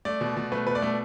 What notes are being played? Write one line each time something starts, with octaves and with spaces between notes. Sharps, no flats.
A3 D5
B2
B2
A3 B4
B2 B4
D5
A3